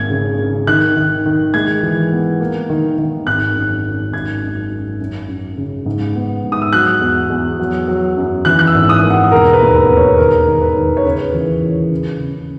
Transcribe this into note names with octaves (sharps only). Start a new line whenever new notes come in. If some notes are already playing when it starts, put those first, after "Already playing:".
Already playing: G#1 A#3 G#6
C#3
C#3
D#3 F#6
D#3
D#3
G#3 G#6
E3
B3
A#3
D#3
D#3
G#1 F#6
F#2
F#2
G#1 G#6
F#2
F#2
F#2
F#2
C#3
G#2
B3
G#2
D#6
E6
F#3 F#6
E2
E2
F#3
F#3
F#2
E3 F#6
F#6
E6
G#1
D#6
A#3
F#5
E1 A#4
B4
D#2
B4
E1
C#5
D#3 A#4
D#3
B4
D#3
C#5
C#3 B4
E3
E3
C#3
C#3